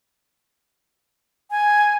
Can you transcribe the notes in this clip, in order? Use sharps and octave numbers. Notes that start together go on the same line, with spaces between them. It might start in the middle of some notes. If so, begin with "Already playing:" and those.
G#5